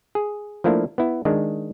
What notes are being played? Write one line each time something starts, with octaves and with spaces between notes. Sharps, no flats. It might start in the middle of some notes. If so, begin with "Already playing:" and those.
G#4
F3 A3 A#3 D4 E4
B3 E4
D#3 G#3 D4